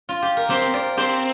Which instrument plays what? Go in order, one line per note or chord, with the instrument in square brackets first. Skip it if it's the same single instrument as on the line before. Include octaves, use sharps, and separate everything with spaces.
[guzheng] F4
G4
A#4
[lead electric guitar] C4 [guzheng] G4 C5
[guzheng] A#4 D5
[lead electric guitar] C4 [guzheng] G4 C5